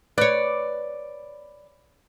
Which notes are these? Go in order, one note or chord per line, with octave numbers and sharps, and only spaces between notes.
B4 C#5 D5